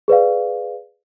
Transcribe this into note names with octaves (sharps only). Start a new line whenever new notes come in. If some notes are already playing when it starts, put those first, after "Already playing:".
G#4 B4 D5 F5